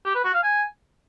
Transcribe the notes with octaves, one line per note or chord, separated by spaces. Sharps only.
G4
B4
F#4
F5
G#5